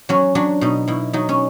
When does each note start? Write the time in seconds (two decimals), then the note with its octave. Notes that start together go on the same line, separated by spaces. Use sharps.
0.09 F#3 C#4
0.35 F#3 D4
0.61 B2 D#4
0.88 B2 E4
1.13 F#3 D#4
1.29 C#4